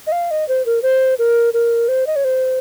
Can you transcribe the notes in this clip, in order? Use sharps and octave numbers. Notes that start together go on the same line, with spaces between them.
D#5
F5
D#5
C5
A#4
C5
A#4
A#4
C5
D#5
C#5
C5